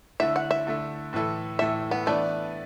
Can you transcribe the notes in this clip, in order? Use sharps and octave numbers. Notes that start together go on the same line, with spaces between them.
D3 A3 E4 E5
F#5
E5
D3 A3 E4
A2 E3 A3 E4 A4
A2 E3 A3 E4 A4 E5
B3
E3 A3 B3 D4 B4 D5